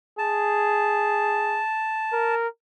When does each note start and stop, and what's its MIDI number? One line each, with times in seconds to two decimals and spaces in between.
0.19 1.62 68
0.19 2.35 81
2.13 2.48 70